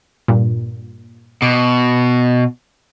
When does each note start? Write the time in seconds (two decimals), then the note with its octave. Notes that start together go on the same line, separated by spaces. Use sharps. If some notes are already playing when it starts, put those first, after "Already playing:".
0.28 G2 A#2
1.42 B2 D6 D7